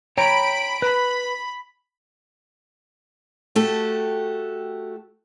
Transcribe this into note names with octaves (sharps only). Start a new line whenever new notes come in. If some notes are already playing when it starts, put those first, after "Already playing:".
C#5 G5 A#5 B5 D7
B4 B5
A3 F#4 G4 A4